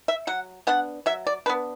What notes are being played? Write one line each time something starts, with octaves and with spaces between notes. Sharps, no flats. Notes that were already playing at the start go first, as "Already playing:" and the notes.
E5
F#3 F#5
B3 D4 F#5
F#3 E5
D5
B3 D4 B4